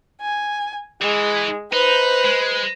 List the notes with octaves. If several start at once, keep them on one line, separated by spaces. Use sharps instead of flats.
G#5
E3 G#3
D#4 B4 C5
G#3